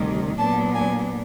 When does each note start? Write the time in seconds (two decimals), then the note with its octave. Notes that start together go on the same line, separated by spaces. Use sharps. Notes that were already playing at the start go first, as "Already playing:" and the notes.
Already playing: D2 C3 D#3 G3
0.38 A#2 F#3 B3 D4 A5
0.74 G#5